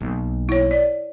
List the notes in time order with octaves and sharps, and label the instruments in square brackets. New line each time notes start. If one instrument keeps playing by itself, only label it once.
[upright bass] B1 A#3
[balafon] E4 C#5
D5